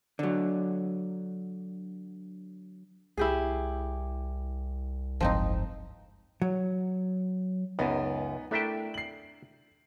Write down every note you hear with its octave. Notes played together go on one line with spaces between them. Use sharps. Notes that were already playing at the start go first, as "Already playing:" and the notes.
D3 F#3
C2 E4 G4 G#4
F#1 G#2 F3 C4 D#4
F#3
C#2 F#2 B3 D#4
A3 D4 E4 A#4 E5 G5
C7 F#7